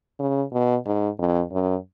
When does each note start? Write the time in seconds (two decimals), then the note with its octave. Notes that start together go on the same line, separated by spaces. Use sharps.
0.19 C#3
0.52 B2
0.86 G#2
1.19 F2
1.52 F#2